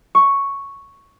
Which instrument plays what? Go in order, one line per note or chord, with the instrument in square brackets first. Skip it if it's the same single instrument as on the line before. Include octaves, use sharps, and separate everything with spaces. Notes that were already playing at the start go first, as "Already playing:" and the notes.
[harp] C#6